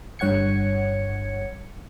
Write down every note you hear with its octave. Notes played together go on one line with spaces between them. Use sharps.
G1 G2 C#5 F#5 G#6 C#7